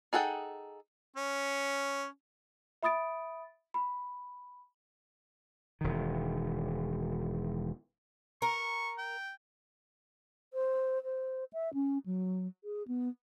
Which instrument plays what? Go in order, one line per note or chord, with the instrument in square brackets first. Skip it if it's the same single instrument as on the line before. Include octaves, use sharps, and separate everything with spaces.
[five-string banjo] D#4 G#4 A4 F#5 G5
[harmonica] C#4
[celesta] E5 B5 D#6 A6 D7
B5
[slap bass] E1 D#3
[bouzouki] A#4 [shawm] C#6
[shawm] G5
[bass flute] C5
C5
E5
C#4
F#3
G#4
B3